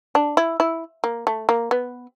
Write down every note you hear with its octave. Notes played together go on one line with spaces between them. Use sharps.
D4
E4
E4
A#3
A3
A#3
B3